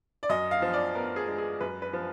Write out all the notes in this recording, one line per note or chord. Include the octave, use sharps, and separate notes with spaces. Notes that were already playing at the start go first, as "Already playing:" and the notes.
D5
F#2 D#5
F5
F3
D5
B3 A#4
G#4
G#3
G#4
F#2 B4
B4
F3